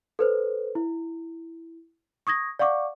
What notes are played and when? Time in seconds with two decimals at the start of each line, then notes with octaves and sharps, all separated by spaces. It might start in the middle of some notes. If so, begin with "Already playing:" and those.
0.19 A4 B4 C5
0.75 E4
2.27 C#6 D#6 G#6 A#6
2.59 D5 F5 F#5 C#6 D6